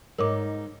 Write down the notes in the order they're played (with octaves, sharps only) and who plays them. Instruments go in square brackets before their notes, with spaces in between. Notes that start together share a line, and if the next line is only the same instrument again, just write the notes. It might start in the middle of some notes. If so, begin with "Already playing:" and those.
[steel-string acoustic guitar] G#2 D#4 [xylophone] A#4 C#5 D6